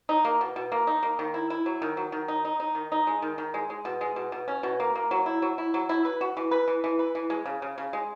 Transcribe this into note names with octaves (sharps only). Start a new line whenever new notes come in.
D#4
A#3
B2
B2
A#3
D#4
A#3
D#3
E4
E4
F#3
D#3
F#3
D#3
D#4
D#4
D#4
D#3
D#4
G#3
D#3
D#3
G#3
G#3
B2
G#3
B2
B2
C#4
B2
A#3
A#3
F#3
E4
F#3
E4
F#3
E4
B4
F#4
E3
B4
E3
E3
B4
E3
G#3
C#3
C#3
C#3
G#3